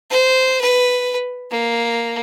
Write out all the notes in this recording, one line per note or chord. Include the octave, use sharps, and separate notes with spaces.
C5
B4
A#3